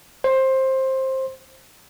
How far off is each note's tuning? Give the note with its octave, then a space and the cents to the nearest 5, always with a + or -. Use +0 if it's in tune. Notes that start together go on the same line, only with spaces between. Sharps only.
C5 +15